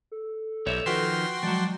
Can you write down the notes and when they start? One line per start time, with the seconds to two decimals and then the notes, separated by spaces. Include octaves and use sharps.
0.12 A4
0.66 B1 G4 C#5 D5 E5
0.86 D#3 F3 F#4 B4 G5 C6
1.43 F3 F#3 G#3 D5